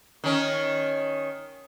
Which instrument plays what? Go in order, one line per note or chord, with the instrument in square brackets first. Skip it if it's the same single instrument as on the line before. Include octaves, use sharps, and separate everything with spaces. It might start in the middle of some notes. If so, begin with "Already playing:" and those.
[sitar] D#3 C#4